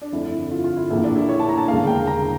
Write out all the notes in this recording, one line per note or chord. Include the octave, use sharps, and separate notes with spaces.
D4
G1 F2 D3 A3 E4
E4
F4
F4
E4
A#1 A2 E3 A#3 E4
D4
E4
C#5
A5
A#5
A5
E1 D2 C#3 G3 A#3 F5
G5
A#5